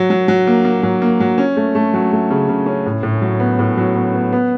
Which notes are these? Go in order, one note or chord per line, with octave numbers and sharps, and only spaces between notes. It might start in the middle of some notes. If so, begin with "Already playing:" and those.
Already playing: F#3
F#3
F#3
A#3
A#3
F#3
A#3
F#3
C#4
A3
A3
F#3
A3
C#3
C#3
C#4
A2
A2
F#3
B3
A2
F#3
B3
B3
B3